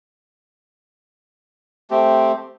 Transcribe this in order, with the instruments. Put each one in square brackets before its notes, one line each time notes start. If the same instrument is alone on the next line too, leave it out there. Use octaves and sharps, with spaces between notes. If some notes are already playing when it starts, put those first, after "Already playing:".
[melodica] A3 C4 G4